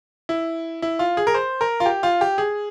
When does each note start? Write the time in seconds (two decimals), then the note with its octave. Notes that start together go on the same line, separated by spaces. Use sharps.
0.29 E4
0.82 E4
0.99 F4
1.17 G#4
1.27 A#4
1.34 C5
1.61 A#4
1.80 F4
1.86 G4
2.03 F4
2.21 G4
2.38 G#4